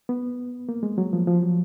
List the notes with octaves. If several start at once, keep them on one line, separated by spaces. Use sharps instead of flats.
B3
A#3
G#3
F#3
F3
F3
F#3